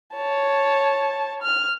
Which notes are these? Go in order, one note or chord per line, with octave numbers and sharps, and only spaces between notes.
C#5 A5
F6